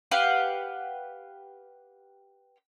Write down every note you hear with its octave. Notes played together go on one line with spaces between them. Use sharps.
G4 B4 F5 F#5